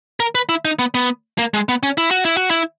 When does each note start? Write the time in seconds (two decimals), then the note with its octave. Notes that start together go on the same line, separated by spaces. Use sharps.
0.20 A#4
0.35 B4
0.49 E4
0.65 D#4
0.79 B3
0.95 B3
1.39 A#3
1.54 G#3
1.69 B3
1.83 C#4
1.98 E4
2.11 F#4
2.25 E4
2.37 F#4
2.50 E4